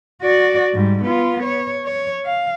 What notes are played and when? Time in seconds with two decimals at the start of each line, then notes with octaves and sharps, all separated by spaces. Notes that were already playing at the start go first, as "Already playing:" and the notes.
0.22 F#4 D5
0.73 G#2 G3
1.05 B3 F4
1.44 C#5
1.85 C#5
2.26 F5